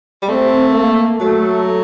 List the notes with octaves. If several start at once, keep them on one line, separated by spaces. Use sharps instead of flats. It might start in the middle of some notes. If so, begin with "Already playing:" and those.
G3
A3 C4
A#3
F#3 A3